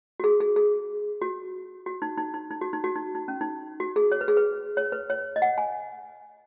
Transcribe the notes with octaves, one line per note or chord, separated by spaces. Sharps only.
F#4
G#4
G#4
G#4
F#4
F#4
D#4
D#4
D#4
D#4
F#4
D#4
F#4
D#4
D#4
C#4
D#4
F#4
G#4
C#5
B4
G#4
B4
C#5
B4
C#5
D#5
F#5
G#5